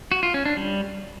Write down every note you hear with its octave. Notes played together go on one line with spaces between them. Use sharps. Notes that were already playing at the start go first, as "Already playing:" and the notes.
F#4
F4
C#4
D4
G3